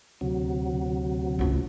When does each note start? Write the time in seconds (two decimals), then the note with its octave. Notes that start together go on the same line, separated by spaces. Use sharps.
0.21 D2 C3 F#3
1.39 C#2 A3